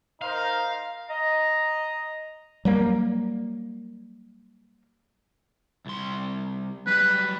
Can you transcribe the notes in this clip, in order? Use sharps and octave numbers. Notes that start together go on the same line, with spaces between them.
D#4 A#4 C5 F5
D#5 A#5
F#3 G3 A#3
C2 C6
F#3 G3 B4